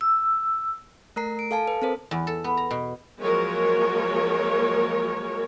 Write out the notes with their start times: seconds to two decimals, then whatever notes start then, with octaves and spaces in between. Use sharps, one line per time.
0.01 E6
1.16 A3 A#4 A#5 C7
1.39 D7
1.51 A4 F5 G#5 A5
1.68 B4
1.82 C4 A4 A#4 C5
2.11 E2
2.27 A4
2.44 B3
2.57 A#5
2.71 B2
3.20 F3 F#3 G#3 A#3 A#4 C#5